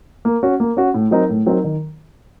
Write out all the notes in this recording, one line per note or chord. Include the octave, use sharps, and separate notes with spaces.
A#3
C#4 F#4
A#3
C#4 F#4
A2
F#3 C4 D#4 A#4
A2
F#3 C4 D#4 A#4
D#3